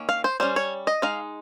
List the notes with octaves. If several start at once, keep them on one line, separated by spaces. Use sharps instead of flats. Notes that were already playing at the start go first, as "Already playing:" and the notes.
Already playing: D#3 A#3 C#4
F5
C5
G3 C#4 C5
C#5
D#5
G#3 D#4 F5